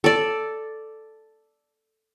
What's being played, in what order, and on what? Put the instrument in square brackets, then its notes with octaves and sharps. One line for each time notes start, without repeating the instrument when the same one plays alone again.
[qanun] A4 D5